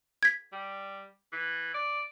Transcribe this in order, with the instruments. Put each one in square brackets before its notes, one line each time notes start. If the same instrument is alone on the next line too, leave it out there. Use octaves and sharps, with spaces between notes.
[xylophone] G#6 B6
[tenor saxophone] G3
E3
D5